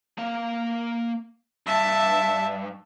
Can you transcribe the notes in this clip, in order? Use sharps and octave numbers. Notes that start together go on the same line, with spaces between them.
A#3 F5
G2 E5 A5